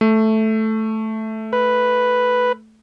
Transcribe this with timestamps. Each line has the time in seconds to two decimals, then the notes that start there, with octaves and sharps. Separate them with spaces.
0.01 A3
1.53 B4